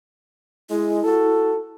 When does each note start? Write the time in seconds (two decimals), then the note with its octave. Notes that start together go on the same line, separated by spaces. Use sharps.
0.70 G#3 E4
1.04 F#4 A4